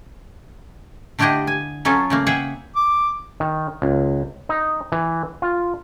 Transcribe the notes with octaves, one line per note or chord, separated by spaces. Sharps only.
D3 A3 D4 E4 G4 D#5
G#5
F#3 C#4 F4 A4
C#3 A3 A#3
G#4 E5 F#5 G5
D6
D#3
C#2
D#4
E3
F4